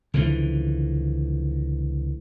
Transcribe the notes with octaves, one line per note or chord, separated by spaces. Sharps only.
C#2 D3 E3 F3